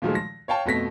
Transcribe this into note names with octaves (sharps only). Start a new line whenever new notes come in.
A#2 D#3 F3 F#3 G#3 A3
A#6
C#5 F5 G5 A5
F2 B2 A3 A#6 B6